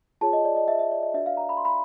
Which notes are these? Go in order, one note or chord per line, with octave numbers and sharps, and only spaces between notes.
F4 G#4 C#5 A5
D#5
D5
D#5
E5
E5
D5
D#5
D4 F#4 B4 D5 E5
F5
A#5
B5
C6
B5